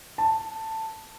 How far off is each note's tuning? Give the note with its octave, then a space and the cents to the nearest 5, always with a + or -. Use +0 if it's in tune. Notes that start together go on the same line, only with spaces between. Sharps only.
A5 +10